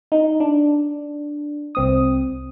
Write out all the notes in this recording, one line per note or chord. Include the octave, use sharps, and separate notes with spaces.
D#4
D4
C2 C4 D#6